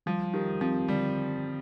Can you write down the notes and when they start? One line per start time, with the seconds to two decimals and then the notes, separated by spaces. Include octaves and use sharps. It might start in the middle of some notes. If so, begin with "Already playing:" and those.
0.06 F3 G3
0.34 D#3 G4
0.61 F3 C4
0.88 D3 G3